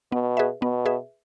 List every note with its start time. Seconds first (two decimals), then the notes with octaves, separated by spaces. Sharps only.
0.12 B2 B3
0.37 G#4 B4 E5
0.61 B2 B3
0.85 G#4 B4 E5